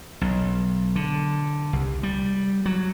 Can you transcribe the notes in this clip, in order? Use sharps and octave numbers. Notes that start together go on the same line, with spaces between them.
B1
D3
C2
G3
F#3